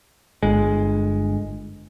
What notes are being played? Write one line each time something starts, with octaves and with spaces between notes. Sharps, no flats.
G1 G#3